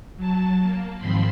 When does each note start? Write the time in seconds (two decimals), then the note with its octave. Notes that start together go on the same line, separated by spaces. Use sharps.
0.16 F#3 A5
0.61 A#3
0.97 G#2 D#3 F3 C4 B5 C6